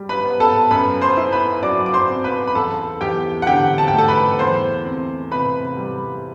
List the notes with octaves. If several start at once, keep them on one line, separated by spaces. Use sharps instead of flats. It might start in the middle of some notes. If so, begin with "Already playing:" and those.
Already playing: G3
B4 B5
B3
A4 A5
F#2 B4 B5
C5 C6
E4
B4 B5
F#3 D5 D6
D6
C5 C6
C4
B4 B5
B5
E2 A4 A5
E2 G4 G5
F#5
D3 G4 G5
A5
G5
A3
A4 A5
B4 B5
E2 C5 C6
C4
C3 B4 B5
G3